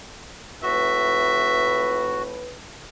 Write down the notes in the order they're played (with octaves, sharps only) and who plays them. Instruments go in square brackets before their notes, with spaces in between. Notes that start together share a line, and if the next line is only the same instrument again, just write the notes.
[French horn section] F2 A2 B4 [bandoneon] F#4 [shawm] E5